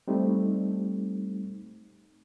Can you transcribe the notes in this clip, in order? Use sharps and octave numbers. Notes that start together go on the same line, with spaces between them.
G3 A3 C4 D#4